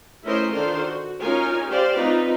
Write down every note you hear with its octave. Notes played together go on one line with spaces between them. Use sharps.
A3 C#4 E4 A#4 C5 D#5
D#3 D4 F4 A4 C5
F#4
C#4 D#4 F4 A#4 G#5
G4 C5 D5 F5
C4 D#4 F4 B4